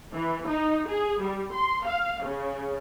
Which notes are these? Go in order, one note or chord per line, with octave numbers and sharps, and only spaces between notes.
E3
D#4
G#4
G3
C6
F5
C#3